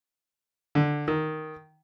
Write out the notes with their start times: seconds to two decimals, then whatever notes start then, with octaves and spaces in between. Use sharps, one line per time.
0.75 D3
1.08 D#3